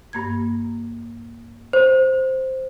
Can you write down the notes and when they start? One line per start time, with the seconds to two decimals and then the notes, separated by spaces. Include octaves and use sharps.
0.13 G2 A#3 G#6
1.73 C5